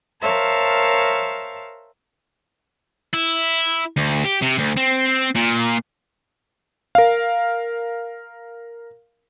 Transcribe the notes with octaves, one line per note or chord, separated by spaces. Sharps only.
A#4 C5 C#5 E5 F5 A5
E4
D2
G4
C3
D2
C4
A#2
A#4 F5